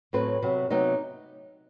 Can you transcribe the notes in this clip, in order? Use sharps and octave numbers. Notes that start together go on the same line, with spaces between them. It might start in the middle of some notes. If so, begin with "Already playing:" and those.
A2 F#3 C4 B4
C3 F#3 B3
C3 F#3 B3 D#4